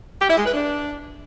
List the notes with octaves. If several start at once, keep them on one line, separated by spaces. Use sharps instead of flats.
G4
E4
G#3
B4
D4